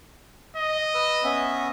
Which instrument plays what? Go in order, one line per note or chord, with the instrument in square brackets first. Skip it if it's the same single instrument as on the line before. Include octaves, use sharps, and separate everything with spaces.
[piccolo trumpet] D#5
[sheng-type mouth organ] B4 E6
B3 C#4 E5